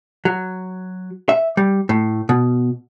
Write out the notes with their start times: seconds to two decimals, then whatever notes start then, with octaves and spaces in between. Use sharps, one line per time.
0.25 F#3
1.29 E5
1.57 G3
1.89 A2
2.29 B2